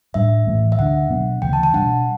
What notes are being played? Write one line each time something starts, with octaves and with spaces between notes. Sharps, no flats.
A2 G3 D4 E5
A2 E3 A3 C#4
E5
D2 D3 G3 D4 F#5
B2 F#3 B3 D4
D2 C#3 E3 G5
A5
A5
B2 G3 D4 F#5